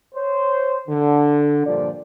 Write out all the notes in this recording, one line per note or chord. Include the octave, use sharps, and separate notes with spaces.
C5 C#5
D3
G2 A#2 D3 F3 D5